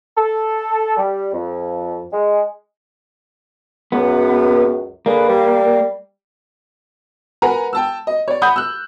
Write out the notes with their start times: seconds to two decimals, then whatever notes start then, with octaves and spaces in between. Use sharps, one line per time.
0.17 A4
0.97 G3
1.33 F2
2.13 G#3
3.92 C#2 F#2 B3
5.06 D3 A#3 G#4 B4
5.28 G3
7.42 A#4 B4 F#5 G#5 A#5
7.73 G5 A5 E6
8.07 D#5
8.28 C#5 D5
8.42 F#5 B5 D#6 G6
8.56 E6 F#6